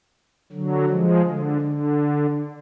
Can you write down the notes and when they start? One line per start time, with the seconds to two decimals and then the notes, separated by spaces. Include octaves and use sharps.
0.52 D3 F#3
0.89 F3 G#3
1.26 D3
1.61 D3